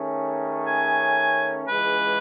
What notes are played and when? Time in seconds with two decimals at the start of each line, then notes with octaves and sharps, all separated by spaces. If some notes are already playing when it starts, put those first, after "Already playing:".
Already playing: D#3 A3 C#4 G#4
0.67 G#5
1.68 C#2 C#3 E3 G#3 B4